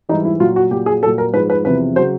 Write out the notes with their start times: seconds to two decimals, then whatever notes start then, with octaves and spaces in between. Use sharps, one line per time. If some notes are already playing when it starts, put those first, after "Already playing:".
0.09 G#2 E3 G3 D#4
0.25 E4
0.40 A#2 F#3 F4
0.56 F#4
0.71 A#2 F#3 G4
0.86 G#4
1.03 A#2 F#3 A4
1.18 A#4
1.34 G#2 F3 B4
1.50 B4
1.65 E2 C3 F3 B4
1.96 C#3 F#3 C5